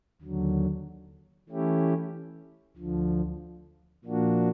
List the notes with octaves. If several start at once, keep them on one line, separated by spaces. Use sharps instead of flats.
D#2 D3 F#3
E3 A3 C#4 E4 G4
D2 D3 F3
A#2 F3 A#3 D4 F#4